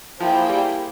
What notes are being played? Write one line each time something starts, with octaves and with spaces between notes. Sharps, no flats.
F3 A#3 E4 G#4 C5 G5
G3